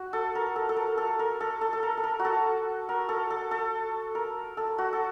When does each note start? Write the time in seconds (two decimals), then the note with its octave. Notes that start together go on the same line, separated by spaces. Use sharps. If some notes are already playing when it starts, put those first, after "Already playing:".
Already playing: F#4
0.13 A4
0.35 A#4
0.56 A4
0.69 A4
0.77 A#4
0.98 A4
1.19 A#4
1.41 A4
1.61 A4
1.73 A4
1.83 A#4
1.97 A4
2.04 A#4
2.19 F#4
2.25 A4
2.89 A#4
3.09 A4
3.30 A4
3.51 A4
4.15 A#4
4.57 A4
4.78 F#4
4.93 A4